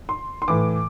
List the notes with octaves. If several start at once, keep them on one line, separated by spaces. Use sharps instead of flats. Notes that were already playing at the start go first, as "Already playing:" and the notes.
C6
C6
A2 E3 D6